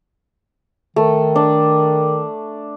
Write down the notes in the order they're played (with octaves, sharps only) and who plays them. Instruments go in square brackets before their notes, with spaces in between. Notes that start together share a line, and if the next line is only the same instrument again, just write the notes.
[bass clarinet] D#3 [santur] A3
[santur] D4